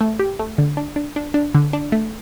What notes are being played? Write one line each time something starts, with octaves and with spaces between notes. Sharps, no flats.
A3
G4
A3
D3
D4
D4
D4
D4
D3
D4
A3